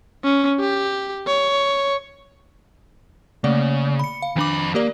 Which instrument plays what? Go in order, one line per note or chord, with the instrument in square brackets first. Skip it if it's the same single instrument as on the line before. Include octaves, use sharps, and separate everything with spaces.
[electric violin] C#4
G4
C#5
[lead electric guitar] C#3 [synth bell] A3 A#3 D5
[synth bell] B5 C#7
F5
[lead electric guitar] F2 B5 [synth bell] D#3 D4 D6
[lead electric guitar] A#3 [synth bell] G4 A#4 D5